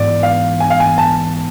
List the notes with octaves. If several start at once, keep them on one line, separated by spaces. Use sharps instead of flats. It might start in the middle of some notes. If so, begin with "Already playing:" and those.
Already playing: G#2 E3 B3 D5
F5
G#5
F5
G#5
A5